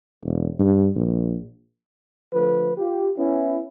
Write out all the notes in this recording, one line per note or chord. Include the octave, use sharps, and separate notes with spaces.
E1
G2
A#1
D3 F3 A3 B4
F4 G4
B3 C#4 E4